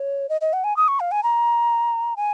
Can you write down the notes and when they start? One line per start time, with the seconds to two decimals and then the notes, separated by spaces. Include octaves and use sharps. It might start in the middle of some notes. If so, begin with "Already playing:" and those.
Already playing: C#5
0.29 D#5
0.41 D#5
0.53 F#5
0.64 G#5
0.77 D#6
0.88 C#6
1.00 F5
1.12 G#5
1.23 A#5
2.17 G#5